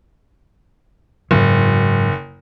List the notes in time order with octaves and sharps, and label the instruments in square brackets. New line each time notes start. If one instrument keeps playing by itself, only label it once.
[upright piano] F#1 [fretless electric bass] G#2 F#3